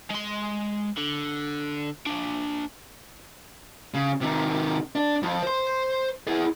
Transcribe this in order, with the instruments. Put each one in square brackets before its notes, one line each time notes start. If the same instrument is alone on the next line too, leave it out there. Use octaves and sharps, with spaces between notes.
[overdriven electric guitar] G#3 C6
D3
A#3 D4
[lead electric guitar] C#3
C3 D#3
D4
F2 F3
C5 C6
E4 G#4